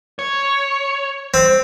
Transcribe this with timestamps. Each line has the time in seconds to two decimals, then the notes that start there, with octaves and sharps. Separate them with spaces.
0.19 C#5
1.34 C4